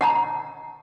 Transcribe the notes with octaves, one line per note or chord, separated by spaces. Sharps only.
F#5 A5 A#5